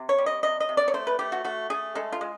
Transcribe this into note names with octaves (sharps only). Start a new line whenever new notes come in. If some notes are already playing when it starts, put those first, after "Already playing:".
Already playing: C3
C#5
G3
D#5
C3 D#5
D#5
C3
D5
C#5
A3 C5
B4
A3 G4
F#4
A3 F#4
A3 G#4
G#3 A4
F4
G#3